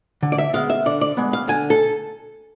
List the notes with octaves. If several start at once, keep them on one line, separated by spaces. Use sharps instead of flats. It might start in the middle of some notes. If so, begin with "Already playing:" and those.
D3
D5
E5
G#3 B3 F5
E5
D3 D5
D5
G#3 B3
F5
D3 G#5
A4